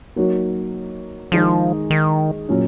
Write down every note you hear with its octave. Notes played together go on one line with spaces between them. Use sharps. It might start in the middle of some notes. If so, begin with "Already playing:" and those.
F#3 A#3 D#4 F#4 C#5
D#3 F3 G#3 D#4 G#4 D#5
D#3
A#2 F#3 C#4